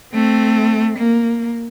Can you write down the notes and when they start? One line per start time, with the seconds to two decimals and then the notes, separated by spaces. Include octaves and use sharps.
0.14 A3 C4
0.97 A#3